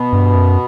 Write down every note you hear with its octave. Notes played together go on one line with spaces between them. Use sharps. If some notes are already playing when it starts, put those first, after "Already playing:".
Already playing: B2 B3
G2
F#2